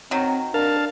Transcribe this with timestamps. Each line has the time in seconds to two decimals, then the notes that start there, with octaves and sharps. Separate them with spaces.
0.11 D#3 F#3 C4
0.54 D4 A#4 F5 A5